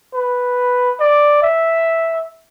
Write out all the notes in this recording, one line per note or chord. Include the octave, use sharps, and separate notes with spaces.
B4
D5
E5